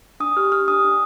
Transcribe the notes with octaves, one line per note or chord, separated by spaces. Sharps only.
D4 D#6
G4 F6
G4 F6
D4 D#6
D4